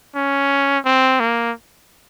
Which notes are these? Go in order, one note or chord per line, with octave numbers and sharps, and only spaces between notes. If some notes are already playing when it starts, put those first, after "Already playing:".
C#4
C4
A#3